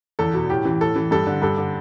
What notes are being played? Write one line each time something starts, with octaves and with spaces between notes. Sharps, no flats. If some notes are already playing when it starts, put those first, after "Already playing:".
E2 A4
B2
A2 G4
E3
A2 A4
E3
G2 A4
D3
G2 A4
D3